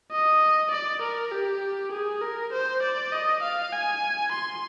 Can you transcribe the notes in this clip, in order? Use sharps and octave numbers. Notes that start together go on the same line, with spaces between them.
D#5
D5
A#4
G4
G#4
A#4
C5
D5
D#5
F5
G#5
C6